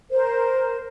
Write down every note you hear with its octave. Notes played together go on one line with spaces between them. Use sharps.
A#4 C5